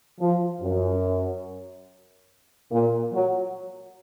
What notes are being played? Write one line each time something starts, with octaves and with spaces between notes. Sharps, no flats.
F3
F#2
A#2
F#3